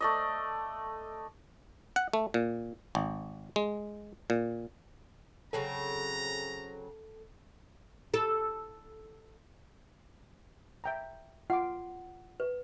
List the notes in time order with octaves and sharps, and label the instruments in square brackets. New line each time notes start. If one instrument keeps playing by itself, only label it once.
[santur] A3 D5 D#5
[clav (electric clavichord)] F#5
A3
A#2
G#1
G#3
A#2
[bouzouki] C#3 F#3 C4 [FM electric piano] A4 [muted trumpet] A#5
[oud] A4
[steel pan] E5 G5 A#5
[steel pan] F4 D6 [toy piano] F#5
[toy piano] B4